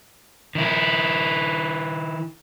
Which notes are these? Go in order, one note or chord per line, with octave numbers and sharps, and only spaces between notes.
D#3 E4